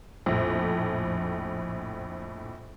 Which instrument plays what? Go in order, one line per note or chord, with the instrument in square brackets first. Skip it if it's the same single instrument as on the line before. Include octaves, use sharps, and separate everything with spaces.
[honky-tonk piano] A#1 F2 A2